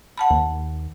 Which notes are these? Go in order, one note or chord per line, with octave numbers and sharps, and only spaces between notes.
F#5 A5 B5
D#2